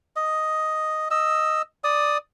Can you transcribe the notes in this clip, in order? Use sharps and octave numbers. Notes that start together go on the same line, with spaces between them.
D#5
D#5 E6
D5 D#6